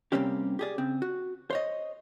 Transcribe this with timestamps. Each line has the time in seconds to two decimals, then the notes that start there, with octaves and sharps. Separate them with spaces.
0.12 C3 G3 A#3 C4 C#4 G4
0.59 G4 G#4 D5
0.78 C#3 C4
1.02 F#4
1.50 C5 C#5 D#5